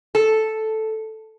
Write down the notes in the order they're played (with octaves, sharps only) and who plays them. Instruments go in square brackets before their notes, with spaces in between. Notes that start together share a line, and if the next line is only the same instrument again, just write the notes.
[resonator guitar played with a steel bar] A4